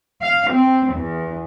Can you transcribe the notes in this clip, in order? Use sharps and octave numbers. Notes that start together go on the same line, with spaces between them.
F5
C4
E2